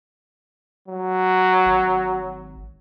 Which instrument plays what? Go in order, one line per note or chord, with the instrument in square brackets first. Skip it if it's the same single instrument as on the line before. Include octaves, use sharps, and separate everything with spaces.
[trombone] F#3
[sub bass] G#1